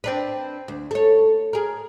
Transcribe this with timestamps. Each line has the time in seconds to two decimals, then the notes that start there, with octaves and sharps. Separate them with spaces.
0.04 C4 D4 B4
0.68 D2
0.91 A4 C#5
1.53 G#4 A#4